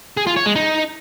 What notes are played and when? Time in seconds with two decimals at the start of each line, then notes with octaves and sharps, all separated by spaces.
0.17 G#4
0.27 F4
0.36 C#5
0.46 G#3
0.56 D#4